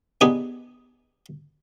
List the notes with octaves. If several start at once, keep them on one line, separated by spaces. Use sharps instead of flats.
B3 D4 D#4 G4 G#4